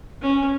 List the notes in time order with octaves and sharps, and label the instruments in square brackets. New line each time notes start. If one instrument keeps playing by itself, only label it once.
[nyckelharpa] C#4